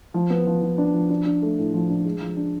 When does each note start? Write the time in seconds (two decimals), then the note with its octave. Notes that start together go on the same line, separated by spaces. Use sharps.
0.14 F3
0.30 B3
0.47 F3
0.62 F3
0.78 D4
0.94 F3
1.10 D4
1.25 D4
1.42 A3
1.58 A2
1.74 F3
1.90 D4
2.05 G#3
2.21 F3
2.36 D4